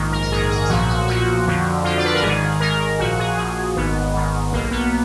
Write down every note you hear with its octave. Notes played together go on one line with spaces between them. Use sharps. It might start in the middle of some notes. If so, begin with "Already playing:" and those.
Already playing: A#1 G#2 D#3
A#4
A#4
A#1 G#2 D#3 G#4
G#4
G#4
B1 A#2 F3 F#4
F#4
B1 A#2 F3 F#4
F2 D3 F3
F2 D3 F3 F4
D5
B4
A#4
G#1 G#2 D#3 G#4
G#1 G#2 D#3 A#4
A#1 A#2 F3 F#4
G#4
A#1 A#2 F3 G#4
G#1 G#2 D#3 B3
G#1 G#2 D#3
B1 B2 A#3
B3